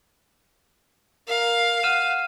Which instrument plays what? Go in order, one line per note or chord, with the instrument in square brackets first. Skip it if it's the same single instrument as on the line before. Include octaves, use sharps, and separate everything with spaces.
[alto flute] A#4 [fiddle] F5
[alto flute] F#5 [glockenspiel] F6 D#7 E7